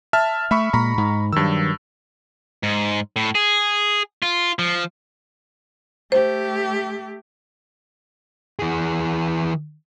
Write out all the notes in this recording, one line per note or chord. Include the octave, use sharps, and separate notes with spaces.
E5 A5 F6
A3 E5 B5 C#6
A#2 G#3 A#5 B5 C#6
G#2
G2 D#3 F#3 E6
G#2
A2
G#4
F4
F3
A3 G4 C5
E3 G#4